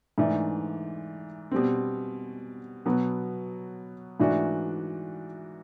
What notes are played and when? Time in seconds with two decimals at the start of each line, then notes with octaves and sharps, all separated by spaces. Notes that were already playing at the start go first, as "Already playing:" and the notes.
0.18 G#2 E3 A3 D4
1.51 B2 G3 C4
2.86 B2 F#3 B3
4.20 G#2 E3 A3 D4 F#4